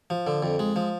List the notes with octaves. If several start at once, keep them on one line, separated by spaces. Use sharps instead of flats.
F3
D3
F2
G#3
F3